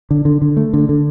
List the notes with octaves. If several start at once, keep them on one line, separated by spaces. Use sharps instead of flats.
D3
D3
D3
A3
D3
D3